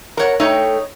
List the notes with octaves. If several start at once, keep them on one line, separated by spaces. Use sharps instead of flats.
A#4 C#5 F#5 A#5
A3 D#4 C#5 G5